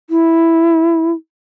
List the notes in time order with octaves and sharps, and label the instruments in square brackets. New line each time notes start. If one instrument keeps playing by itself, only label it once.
[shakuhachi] E4